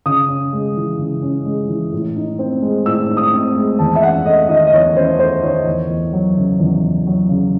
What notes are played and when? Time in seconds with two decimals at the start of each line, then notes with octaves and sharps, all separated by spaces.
0.06 C#3 D#6
0.28 C#4
0.53 G#3
0.76 E3
0.99 C#3
1.22 C#4
1.45 G#3
1.69 E3
1.92 A2
2.16 D#4
2.39 C4
2.62 G#3
2.86 A2 E6
3.09 D#4
3.17 D#6
3.33 C4
3.56 G#3
3.79 E2 A5
3.95 E5
4.03 C#4 F#5
4.25 A3 D#5
4.49 D#3 D#5
4.67 D#5
4.72 E2 C#5
4.96 C#4 C5
5.19 A3 C5
5.43 D#3 C#5
5.66 E2
5.89 E2
6.13 F#3
6.37 C#3
6.59 E2
6.83 E2
7.07 F#3
7.29 C#3